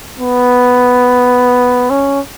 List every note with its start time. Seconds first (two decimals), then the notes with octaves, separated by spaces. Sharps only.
0.19 B3
1.90 C#4